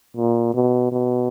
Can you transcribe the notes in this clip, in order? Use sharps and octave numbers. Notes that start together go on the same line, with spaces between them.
A#2
B2
B2